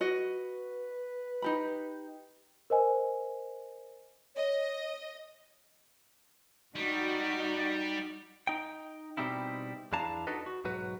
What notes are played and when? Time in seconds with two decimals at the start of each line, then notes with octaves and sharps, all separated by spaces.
0.01 F#4 B4 D#5
1.42 D#4 G4 B5
2.70 A#4 C5 D#5 G#5
4.35 C#5 D#5
6.76 G3 D#4 F#4
8.47 D#4 G5
9.17 B2 D3 G3 C4 D#4 E4
9.92 E2 D4 E4 F5 A5 A#5
10.27 D4 D#4 F#4 A4 B4 D#5
10.46 F#4
10.64 B1 G#2 F#3 F#4 B4